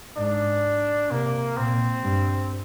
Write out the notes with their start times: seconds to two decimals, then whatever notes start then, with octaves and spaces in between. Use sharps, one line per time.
0.17 G#2 D4
1.10 C3 A#3
1.57 A#2 C4
2.03 G2